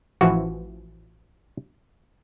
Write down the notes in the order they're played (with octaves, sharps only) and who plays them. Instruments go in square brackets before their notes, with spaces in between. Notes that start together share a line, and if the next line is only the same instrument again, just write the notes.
[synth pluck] A1 E3 F3 [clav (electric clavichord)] F#4